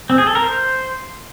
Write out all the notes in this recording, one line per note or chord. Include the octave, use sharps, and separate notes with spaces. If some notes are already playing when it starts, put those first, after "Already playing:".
C4
G#4
A4
A#4
C5